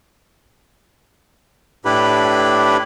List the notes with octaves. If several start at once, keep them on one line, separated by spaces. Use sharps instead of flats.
A2 D4 E4 G4 B4 B5